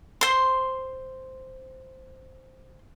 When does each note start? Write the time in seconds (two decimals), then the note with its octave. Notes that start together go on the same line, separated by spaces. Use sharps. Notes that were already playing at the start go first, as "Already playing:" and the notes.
0.21 C5 C6